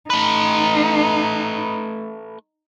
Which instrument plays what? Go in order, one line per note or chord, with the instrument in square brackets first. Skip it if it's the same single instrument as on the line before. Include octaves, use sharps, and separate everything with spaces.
[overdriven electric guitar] A3 B4 [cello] D#4